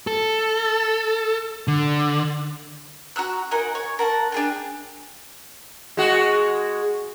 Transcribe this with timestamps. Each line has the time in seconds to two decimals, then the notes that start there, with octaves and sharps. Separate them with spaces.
0.07 A4
1.68 D3
3.16 F#4 A#5 E6 F#6
3.51 D#4 A#4 F#5 G#5
3.75 C#5
3.99 A#4 F#5 A5
4.32 D4 G#4 G5
5.97 G#3 F#4